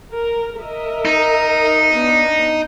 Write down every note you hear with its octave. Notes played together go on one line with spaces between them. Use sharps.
A#4
A#4 D#5 E5
D#4
B3 D4